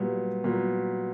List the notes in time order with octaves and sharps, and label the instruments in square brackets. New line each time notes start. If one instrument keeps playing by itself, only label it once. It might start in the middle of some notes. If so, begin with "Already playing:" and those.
Already playing: [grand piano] A#2 F#3 B3 [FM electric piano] G3
[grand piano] A#2 F#3 B3